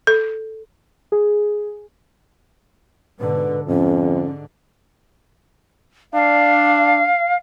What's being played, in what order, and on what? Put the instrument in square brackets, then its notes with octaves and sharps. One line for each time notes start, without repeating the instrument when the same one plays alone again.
[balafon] A4
[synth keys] G#4
[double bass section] G#2 B2 D3 [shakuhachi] B4
[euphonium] F2 [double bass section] G#2 D3 [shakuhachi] C#4
[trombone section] D4 [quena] F5